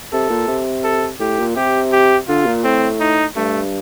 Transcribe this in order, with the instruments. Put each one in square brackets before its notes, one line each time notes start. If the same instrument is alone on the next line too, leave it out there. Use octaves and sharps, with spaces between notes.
[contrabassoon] C3 [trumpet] A4
[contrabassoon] A#2
C3
[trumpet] A4
[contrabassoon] A2 [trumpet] G4
[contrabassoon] A#2
[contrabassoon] C3 [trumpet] G4
[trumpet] G4
[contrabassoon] D3 [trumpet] F4
[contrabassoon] A#2
[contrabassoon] A2 [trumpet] C4
[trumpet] D#4
[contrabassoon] G2 [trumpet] A3